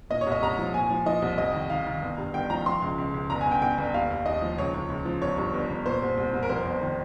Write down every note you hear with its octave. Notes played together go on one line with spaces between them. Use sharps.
A#2 D#5
C#5
C2
D#5
C2 A#5
F3
A#2 G#5
F3
F3 D#5
C2
F2 D#5
D#3
D#3 F5
D#3
G1
G2
G1 G5
F3 A#5
F3 C6
C#2
C#2
C#2
G1 A#5
G#5
G1
G5
G1 G5
G1
D#2 F5
D#2
D#2 D#5
F3
C#2 C#5
C#2
C#2
F3
G1 C#5
G2
G1
G1
A#2 C5
C2
C2
C2
A#4
F2 C5
G1
D#3